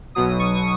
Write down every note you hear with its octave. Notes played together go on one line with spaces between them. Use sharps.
B1 B2 F#3 D#6
C#6